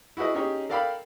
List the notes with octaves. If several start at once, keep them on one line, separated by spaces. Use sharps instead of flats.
E4 F#4 G#4 B4 D#5
C#4 D#4 G4 G#4 C#5
A4 A#4 D5 F5 G5 B5